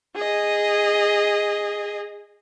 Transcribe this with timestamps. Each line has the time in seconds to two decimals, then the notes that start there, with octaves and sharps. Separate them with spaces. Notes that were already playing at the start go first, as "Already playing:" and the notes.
0.15 G#4 D#5